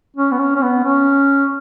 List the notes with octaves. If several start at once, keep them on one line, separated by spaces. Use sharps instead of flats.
C#4
B3
C#4
C#4
B3
C#4